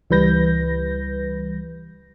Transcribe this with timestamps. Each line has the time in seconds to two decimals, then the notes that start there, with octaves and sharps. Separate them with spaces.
0.10 C#2 E3 G3 B4 G6 A#6